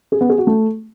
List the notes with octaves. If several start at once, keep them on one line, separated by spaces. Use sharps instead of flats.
G#4
B3
G#4
F#4
A3